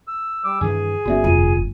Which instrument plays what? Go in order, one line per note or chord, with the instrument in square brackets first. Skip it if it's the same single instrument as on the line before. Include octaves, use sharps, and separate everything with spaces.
[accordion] E6
G3 D6 E6
[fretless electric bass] G2 D#3 E3 [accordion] G#4 G#5
[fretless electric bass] G1 B3 C#4 [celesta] F#4 D5 E5
[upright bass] F1 [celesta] F4 D#7